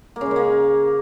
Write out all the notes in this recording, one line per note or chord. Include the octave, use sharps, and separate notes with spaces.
A#3
C#3
G#3
C#3
A#3